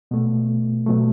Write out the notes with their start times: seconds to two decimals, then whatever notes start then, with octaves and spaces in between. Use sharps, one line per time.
0.11 B2 A3 B3
0.86 B2 F#3 A3